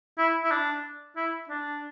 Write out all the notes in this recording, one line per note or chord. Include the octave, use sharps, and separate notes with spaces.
E4
E4
D4
E4
D4